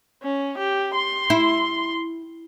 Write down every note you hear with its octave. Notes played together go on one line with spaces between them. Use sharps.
C#4
G4
C6
E4